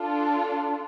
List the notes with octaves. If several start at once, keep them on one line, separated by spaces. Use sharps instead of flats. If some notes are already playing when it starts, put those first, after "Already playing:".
Already playing: D4 F4 A4